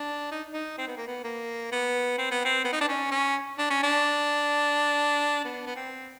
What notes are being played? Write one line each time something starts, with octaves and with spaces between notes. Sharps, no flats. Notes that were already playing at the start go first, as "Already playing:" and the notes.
Already playing: D4
D#4
D#4
C4
B3
A#3
B3
A#3
B3
C4
B3
C4
B3
D#4
D4
C#4
C#4
D4
C#4
D4
B3
B3
C4